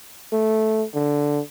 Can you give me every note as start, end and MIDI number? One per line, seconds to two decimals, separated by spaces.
0.33 0.84 57
0.94 1.40 50